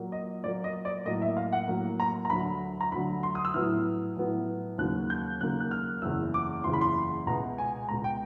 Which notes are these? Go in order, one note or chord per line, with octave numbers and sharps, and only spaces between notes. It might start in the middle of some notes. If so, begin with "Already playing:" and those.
Already playing: A#2 F#3 A#3
D#5
A#2 F#3 A#3 D5
D#5
D5
A2 F#3 A#3 D#5
E5
F5
F#5
A2 F#3 A#3
A#5
A#5
D2 D3 F#3 B5
A#5
D2 D3 F#3 B5
C6
D#6
E6
A2 F#3 B3 E4 F6
A2 F#3 B3 E4
D#2 C#3 F#3 A#3 F#6
G6
D#2 C#3 F#3 A#3 F#6
F#6
F6
F#1 E2 C#3 E6
D6
F#1 E2 C#3 C6
B5
C6
C#2 B2 G#3 A#5
G#5
C#2 B2 G#3 A#5
G5